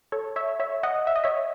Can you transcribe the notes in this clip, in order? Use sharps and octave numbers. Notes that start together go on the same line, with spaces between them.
A4 C#5
C#5 E5
C#5 E5
D#5 F#5
E5
D#5
C#5 E5